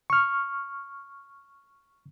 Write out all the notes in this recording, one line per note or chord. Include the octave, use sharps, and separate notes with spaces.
C#6 F6